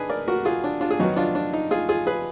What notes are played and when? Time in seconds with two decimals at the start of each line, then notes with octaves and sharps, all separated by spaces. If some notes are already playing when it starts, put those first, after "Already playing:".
Already playing: D4 D#4 G#4 B4
0.09 A#4 D5
0.28 F#4 A#4
0.45 F4 G#4
0.64 D4
0.81 D4 F4
0.91 G#4
0.99 F#2 D#3 F#3 B3 D#4 F#4
1.16 D4 F4
1.35 D4
1.53 D#4
1.71 F4 G#4
1.89 F4 G#4
2.07 G#4 B4